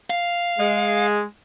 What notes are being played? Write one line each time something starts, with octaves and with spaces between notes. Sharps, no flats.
F5
G#3